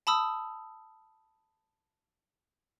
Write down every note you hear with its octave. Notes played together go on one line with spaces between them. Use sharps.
A5 B5 D#6 E6